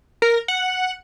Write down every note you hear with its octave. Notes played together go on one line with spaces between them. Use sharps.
A#4
F#5